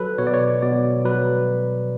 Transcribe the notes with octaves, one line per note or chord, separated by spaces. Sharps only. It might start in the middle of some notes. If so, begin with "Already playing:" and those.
Already playing: F#3 A4 B4
B2 C#5
D5
C#5
B2 D5
F#3 B4